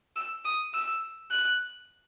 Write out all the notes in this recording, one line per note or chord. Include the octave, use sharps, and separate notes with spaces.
E6
D#6
E6
F#6